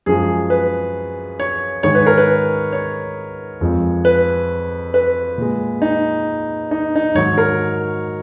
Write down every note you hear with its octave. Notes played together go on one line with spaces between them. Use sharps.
F#2 F3 G#3 G#4
B4
C#5
G#2 D#3 G#3 C#5
B4
A#4
B4
C#5
F2 F3 G#3
B4
B4
A#2 G#3
D#4
D#4
D#4
G#2 D#3 F#3 C#5
A#4